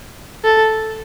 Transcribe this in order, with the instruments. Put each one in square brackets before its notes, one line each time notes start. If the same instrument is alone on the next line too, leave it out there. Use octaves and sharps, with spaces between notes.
[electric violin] A4